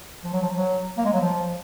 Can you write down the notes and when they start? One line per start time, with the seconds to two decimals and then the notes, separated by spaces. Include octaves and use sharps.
0.24 F3
0.33 F#3
0.42 F3
0.57 F#3
0.98 A#3
1.05 G#3
1.13 F#3
1.22 F3